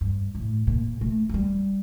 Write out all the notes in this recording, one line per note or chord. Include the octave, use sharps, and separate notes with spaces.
G2
A2
A#2
A3
A3
G3